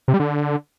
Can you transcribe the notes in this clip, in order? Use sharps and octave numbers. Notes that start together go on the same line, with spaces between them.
C3
G3
D3